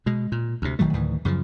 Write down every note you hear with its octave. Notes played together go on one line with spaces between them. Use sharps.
B2 G#3
A#2
D2 C3
A#1 D#3 F#3 A3
D2 A2 D#3 E3
F#2 C#3 E3 F3